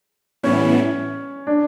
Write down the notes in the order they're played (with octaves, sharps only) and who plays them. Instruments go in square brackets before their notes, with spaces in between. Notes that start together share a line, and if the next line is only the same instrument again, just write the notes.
[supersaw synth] A2 E3 G3 B3 E4 [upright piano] C#4
[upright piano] D4